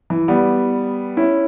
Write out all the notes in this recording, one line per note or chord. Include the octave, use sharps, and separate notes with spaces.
E3
G3 B3
C#4 E4